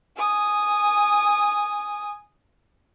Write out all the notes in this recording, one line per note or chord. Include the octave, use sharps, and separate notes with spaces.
G#5 D#6